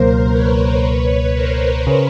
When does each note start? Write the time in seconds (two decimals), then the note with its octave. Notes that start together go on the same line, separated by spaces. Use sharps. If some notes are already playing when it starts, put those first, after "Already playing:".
Already playing: C#2 B2 F#3 A#3 A#4 C5
0.31 B4 C#5
0.83 B4 C#5
1.34 A#4 C5
1.87 C#3